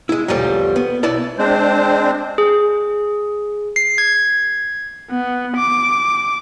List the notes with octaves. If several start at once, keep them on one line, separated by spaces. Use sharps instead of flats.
G#3 E4
B1 E2 D3 F3 G3 A3
B3
B1 B3 E4 D5 A5
G#3 C4 D4 C5
G#4
C7
G#6
B3
D6